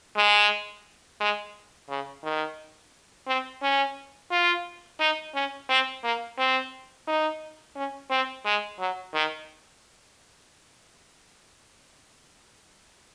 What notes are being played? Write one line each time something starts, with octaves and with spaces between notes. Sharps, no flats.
G#3
G#3
C#3
D#3
C4
C#4
F4
D#4
C#4
C4
A#3
C4
D#4
C#4
C4
G#3
F#3
D#3